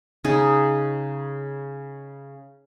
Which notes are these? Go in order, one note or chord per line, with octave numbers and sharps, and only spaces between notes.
C#3 D#4 G#4